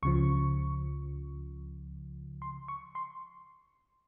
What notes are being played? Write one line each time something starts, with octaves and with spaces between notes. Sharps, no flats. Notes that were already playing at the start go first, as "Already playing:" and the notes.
C#2 C#3 F3 C#6
C6
C#6
C6